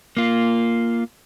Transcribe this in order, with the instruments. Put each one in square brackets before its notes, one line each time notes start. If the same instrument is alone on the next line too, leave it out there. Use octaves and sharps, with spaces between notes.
[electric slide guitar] A#3 F4